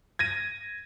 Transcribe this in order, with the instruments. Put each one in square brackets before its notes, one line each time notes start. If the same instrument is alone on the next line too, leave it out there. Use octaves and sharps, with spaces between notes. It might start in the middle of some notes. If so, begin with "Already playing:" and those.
[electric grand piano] G#6 A#6 D#7